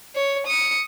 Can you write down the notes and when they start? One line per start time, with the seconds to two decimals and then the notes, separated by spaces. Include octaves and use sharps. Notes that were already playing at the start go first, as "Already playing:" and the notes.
0.15 C#5
0.47 D#6 C#7